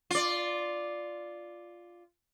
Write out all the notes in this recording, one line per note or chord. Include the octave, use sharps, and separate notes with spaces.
F4 D5